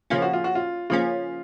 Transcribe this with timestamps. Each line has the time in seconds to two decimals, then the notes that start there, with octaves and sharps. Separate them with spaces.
0.10 C#3 F3 A#3 C#4 F4
0.22 F#4
0.33 F4
0.44 F#4
0.55 F4
0.90 C#3 F3 A#3 C#4 F4